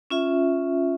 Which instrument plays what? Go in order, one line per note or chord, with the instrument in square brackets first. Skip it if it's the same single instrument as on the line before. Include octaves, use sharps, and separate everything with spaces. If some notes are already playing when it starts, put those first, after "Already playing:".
[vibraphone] C#4 F4 E5